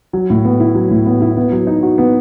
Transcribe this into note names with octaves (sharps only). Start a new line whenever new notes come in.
F#3
A2
B3
E4
F#3
A2
B3
E4
B3
F#3
D#4
F#4
B3